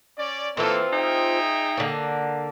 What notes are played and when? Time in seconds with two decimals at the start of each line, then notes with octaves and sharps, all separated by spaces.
0.17 C#4 D5
0.57 E3 A#3 C4 F4 A4
0.92 D#4 G#4 E5 G5
1.77 D3 A#3